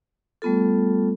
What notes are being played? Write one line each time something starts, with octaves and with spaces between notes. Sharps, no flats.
G3 A3 B3 F4 A4